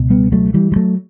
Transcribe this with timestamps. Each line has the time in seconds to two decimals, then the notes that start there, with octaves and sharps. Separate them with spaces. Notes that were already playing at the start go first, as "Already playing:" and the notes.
Already playing: C#2 B2
0.10 G3 B3
0.32 F#3 A3
0.54 E3 G3
0.72 G3
0.76 F#3 A3